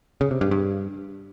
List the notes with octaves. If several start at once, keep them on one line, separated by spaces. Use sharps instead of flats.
C#3
C3
G2
G2